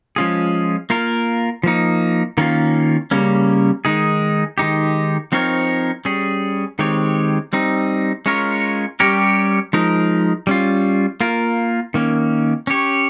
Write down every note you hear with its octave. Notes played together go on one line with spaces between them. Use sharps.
F3 G#3 C#4 F4 G#4
A#3 F4 A#4
F3 A#3 D#4
D#3 A#3 C#4 F4
C#3 G3 A#3 C#4
D#3 G#3 D#4 G#4
D#3 G#3 D#4 G4
F3 C4 D#4 A#4 C#5
G3 C#4 G#4
D#3 G#3 C4 G4 C#5
G3 C4 D#4
G#3 C#4 F4 A#4 C#5
G3 C#4 G4 A#4 C#5
F3 G#3 D#4 A#4
G3 C#4 F4
A#3 F4 A#4
D#3 A#3 C#4
C#4 G4 C#5